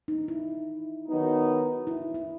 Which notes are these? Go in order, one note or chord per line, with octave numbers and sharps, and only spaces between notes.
D#4
E4
D#3 F#3 B3 D#4
E4
E4